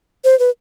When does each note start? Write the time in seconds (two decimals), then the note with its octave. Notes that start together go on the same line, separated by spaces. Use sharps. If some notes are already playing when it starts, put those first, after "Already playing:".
0.24 C5
0.39 B4